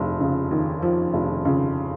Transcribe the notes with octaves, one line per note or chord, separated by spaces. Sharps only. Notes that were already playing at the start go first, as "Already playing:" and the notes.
Already playing: F1 F3
C#3
D#2
F3
F1
C#3